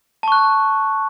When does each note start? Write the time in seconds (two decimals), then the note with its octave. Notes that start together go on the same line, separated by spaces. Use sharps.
0.23 A5
0.28 C#6
0.32 F#6